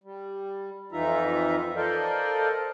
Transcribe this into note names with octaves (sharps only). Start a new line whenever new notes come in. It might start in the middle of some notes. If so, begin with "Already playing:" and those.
G3
F2 E3 D#4 F4 E5 A#5
A4 A#4 C5 D5 D#5 F5